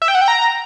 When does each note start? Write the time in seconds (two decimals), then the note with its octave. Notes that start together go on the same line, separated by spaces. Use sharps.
0.02 E5
0.08 G5
0.15 F#5
0.21 G5
0.28 A#5